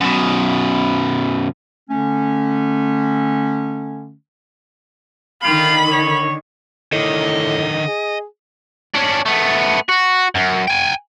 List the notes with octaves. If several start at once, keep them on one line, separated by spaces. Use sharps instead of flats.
F#2 B2
D3 A3 C#4
D3 D#3 F4 G4 F5 B5
C#5
A2 D3 D#3 D#5
G#4
C#4 D4
A3 B3
F#4
F#2
G5 G#5